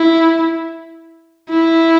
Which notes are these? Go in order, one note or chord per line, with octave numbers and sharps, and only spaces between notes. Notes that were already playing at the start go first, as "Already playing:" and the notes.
Already playing: E4
E4